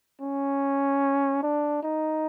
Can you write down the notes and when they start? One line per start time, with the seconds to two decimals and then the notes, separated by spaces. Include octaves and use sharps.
0.21 C#4
1.43 D4
1.83 D#4